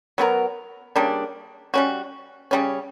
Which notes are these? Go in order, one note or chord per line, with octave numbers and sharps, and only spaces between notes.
F#3 B3 F#4 A#4
C#3 G3 A#3 D4
G3 C#4 F#4
C#3 G3 C#4